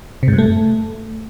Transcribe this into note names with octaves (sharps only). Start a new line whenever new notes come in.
C3
G#2
G2
A3